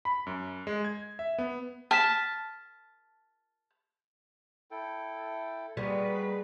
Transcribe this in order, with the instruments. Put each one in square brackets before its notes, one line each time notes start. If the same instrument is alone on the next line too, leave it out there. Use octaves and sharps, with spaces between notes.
[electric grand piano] B5
F#2
G#3
G#6
E5
B3
[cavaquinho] A5 [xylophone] F6 B6 E7
[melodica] E4 A4 G5
[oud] G3 [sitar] G#3 B3 [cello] A#3 B4 [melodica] F#4